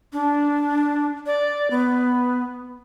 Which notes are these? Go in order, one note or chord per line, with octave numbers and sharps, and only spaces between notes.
D4
D5
B3